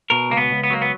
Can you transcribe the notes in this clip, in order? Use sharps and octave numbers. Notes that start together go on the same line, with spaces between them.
B2 A#4
C#2 A#3
B3
C#2
B3
F#3 A#3
B3